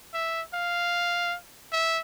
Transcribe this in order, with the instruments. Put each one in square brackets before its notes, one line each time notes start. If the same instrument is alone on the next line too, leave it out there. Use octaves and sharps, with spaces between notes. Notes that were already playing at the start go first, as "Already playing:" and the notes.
[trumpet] E5
F5
E5